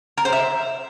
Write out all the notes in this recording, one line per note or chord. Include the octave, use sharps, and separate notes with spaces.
A#4
C5
E5